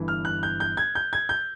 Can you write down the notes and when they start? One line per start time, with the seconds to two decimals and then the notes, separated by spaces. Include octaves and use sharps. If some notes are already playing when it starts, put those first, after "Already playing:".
Already playing: G1 G2 E3
0.08 F6
0.25 F#6
0.43 G6
0.60 G6
0.77 G#6
0.95 G6
1.13 G#6
1.29 G6